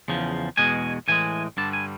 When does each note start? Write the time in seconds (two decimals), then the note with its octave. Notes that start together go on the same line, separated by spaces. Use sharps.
0.08 E2 C#3 F3
0.57 E2 B2 G#3 G#5
1.08 A2 E3 G#3 G#5
1.57 G2 D3 G3 A5
1.73 G#5